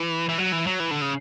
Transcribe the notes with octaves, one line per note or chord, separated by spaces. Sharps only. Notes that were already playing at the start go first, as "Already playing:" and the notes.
Already playing: E3
E3
F#3
E3
F#3
E3
D3
C#3